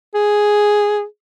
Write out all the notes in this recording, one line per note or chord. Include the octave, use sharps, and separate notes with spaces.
G#4